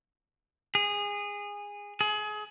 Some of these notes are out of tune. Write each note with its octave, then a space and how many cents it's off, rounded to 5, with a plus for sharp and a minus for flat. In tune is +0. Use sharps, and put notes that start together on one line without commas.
G#4 -20
G#4 +30